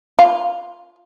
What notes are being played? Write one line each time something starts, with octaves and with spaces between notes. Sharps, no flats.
F4